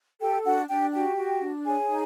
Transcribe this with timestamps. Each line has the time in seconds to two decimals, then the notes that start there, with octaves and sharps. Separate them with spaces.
0.21 G4 A4 G5
0.45 D4 F#4 F#5
0.69 D4 G4 G5
0.93 F#4 G4 G5
1.17 F#4
1.41 D4
1.65 G#4 C#5 G#5
1.89 D#4